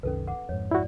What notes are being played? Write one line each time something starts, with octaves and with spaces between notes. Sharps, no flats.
C2 F#2 D#3 C#4 A4 B4
F#5 D6
F2 G#2 C#5
E4 F#4 D5